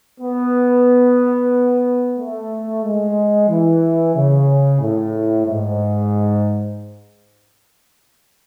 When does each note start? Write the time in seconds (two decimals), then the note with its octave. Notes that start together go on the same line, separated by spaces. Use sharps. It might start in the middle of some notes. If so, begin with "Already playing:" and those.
0.21 B3
2.19 A3
2.84 G#3
3.49 E3
4.16 C#3
4.81 A2
5.46 G#2